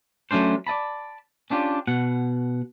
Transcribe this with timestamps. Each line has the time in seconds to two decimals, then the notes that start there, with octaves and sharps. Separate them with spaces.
0.31 F#3 A3 C#4 D4 C5
0.67 D5 D#5 A5 B5
1.50 C#4 D4 F4 G4
1.87 B2 F#5